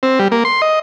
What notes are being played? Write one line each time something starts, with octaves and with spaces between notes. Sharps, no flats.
C4
G3
A#3
C6
D#5